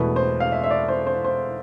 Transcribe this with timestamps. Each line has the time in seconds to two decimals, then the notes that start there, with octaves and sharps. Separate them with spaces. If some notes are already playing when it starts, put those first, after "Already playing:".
Already playing: E1 E2 B2 A3 B4
0.16 C5
0.40 F5
0.52 E5
0.63 E5
0.71 D5
0.88 C5
1.07 C5
1.25 C5